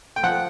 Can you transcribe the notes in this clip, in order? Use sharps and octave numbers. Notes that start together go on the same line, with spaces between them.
G5
F3 F#5